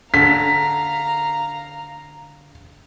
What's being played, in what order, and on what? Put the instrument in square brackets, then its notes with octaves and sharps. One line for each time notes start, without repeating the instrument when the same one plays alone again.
[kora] D3 [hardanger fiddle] F5 A#5 [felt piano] B6